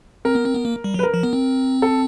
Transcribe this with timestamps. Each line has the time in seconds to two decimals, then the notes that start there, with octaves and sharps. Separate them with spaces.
0.25 C4 A#4
0.35 B3
0.45 C4
0.54 B3
0.65 A#3
0.84 G3
0.94 F#3 B4
1.03 A#4
1.14 F3
1.23 B3
1.33 C4
1.82 A4